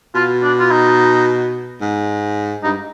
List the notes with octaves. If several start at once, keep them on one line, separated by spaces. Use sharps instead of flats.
B2 F4
D4
F4
D#4
G#2
G2 D#4